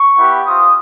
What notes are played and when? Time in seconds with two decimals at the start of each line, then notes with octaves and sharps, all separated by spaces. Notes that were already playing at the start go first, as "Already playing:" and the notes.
Already playing: C#6
0.17 B3 E4 G4
0.46 C4 F4 D#6